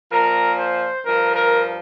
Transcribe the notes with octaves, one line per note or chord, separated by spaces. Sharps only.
A#2 F3 A#4
C5
G2 F3 A#4
A#4